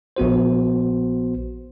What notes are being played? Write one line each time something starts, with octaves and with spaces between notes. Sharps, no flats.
A#1 B3 F#4 C5